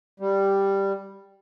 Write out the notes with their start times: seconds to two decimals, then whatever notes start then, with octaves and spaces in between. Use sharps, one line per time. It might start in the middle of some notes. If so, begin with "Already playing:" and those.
0.20 G3